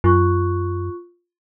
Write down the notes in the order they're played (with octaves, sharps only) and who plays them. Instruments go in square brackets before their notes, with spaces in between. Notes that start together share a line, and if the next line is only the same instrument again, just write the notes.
[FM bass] F#2 [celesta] F4 C#6 F#6